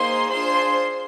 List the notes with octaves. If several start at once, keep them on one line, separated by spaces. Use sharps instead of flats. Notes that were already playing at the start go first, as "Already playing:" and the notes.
Already playing: A#3 D#4 G#4 C5 C6
D4 F4 G#4 C5 C6